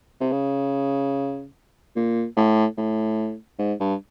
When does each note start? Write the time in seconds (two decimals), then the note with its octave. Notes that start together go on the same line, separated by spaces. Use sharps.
0.20 C3
0.32 C#3
1.96 A#2
2.37 A2
2.78 A2
3.59 G#2
3.80 G2